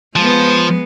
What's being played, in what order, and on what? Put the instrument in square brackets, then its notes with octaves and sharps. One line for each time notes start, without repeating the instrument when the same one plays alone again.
[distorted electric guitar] F3 [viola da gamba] G#3 B3